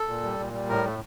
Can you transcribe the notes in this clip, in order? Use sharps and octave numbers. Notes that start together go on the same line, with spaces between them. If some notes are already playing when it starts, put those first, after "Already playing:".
Already playing: A4
A#2
G3
A#2
G3
A2 A#4
A3